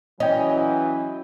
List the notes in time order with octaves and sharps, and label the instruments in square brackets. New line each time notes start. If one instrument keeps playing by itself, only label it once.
[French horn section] E3 F#3 [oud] C#4 [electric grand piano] D#5 G5